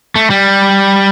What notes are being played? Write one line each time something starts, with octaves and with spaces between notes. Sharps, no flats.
A3
G3